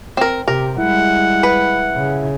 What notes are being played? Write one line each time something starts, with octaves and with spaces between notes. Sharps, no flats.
C4 A#4
C3 G4 A#4
G3 G#3 E4 F#5
B4
C#3